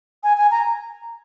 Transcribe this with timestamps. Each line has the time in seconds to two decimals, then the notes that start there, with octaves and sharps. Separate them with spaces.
0.24 G#5
0.37 G#5
0.51 A#5